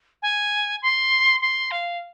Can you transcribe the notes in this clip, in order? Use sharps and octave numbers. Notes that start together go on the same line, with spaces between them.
G#5
C6
C6
F5